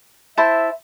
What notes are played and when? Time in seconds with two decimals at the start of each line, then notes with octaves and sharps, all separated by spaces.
0.38 E4 C5 E5 A5